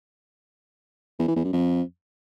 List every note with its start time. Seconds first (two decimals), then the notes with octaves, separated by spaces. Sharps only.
1.19 E2
1.28 E3
1.36 E2
1.45 F#2
1.53 F2